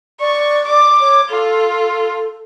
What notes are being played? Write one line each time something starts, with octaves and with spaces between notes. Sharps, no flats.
D5 C#6
D6
C#5
F4 A4